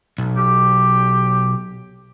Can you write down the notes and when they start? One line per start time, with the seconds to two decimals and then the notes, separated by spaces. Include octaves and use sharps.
0.18 B1
0.37 G4